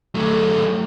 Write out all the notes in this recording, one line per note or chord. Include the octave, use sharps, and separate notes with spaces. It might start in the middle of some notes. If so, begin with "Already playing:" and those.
F#3 A3